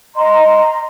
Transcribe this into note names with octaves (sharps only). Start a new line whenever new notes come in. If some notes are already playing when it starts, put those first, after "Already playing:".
D#5 A#5 C6